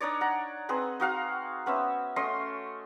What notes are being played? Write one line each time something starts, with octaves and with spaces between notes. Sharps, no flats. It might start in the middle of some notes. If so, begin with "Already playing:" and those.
D4 D#4 C#5 D5
F#5 A#5
C4 D#4 G#4 B4
D#4 F#4 F5 A#5
B3 C#4 C5 E5
A3 C#4 D#5 C6